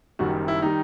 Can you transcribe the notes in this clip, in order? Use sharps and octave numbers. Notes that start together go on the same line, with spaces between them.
F#1 F#2 D#3 G3 F#4
E4
D#3 G3 D#4